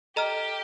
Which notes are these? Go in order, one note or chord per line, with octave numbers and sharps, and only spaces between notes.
G4 A4 D#5 A#5 F6